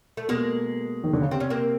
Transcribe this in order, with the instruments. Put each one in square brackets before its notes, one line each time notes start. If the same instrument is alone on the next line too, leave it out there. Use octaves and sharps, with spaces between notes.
[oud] A3
[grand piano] B2 [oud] G#3 A#3
[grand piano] D#3
D3
C#3
[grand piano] C3 [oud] C4
[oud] C#4
A#3 C4